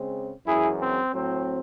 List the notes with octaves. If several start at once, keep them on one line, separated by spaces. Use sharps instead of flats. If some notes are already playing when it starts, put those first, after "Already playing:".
Already playing: C#3 G#3 C4
F#2 E3 G#3 E4 G#4
C4
A2 F#3 C4